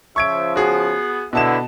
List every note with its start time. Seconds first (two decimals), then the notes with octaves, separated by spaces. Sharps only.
0.16 C#3 F3 E5 C#6 G#6 D7
0.56 B3 F#4 G#4
1.33 B2 D3 B3 E4 E5 A5 E7